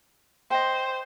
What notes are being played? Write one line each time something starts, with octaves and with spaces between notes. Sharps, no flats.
C5 D#5 G5